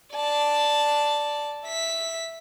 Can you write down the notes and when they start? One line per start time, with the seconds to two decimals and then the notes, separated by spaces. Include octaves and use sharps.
0.14 D5 A5
1.66 E5 B6